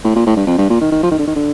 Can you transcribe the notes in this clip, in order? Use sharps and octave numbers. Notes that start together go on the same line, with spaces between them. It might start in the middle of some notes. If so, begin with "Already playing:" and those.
A2
A#2
A2
G2
F2
G2
A#2
D#3
D#3
F3
D#3
D3
D#3
D3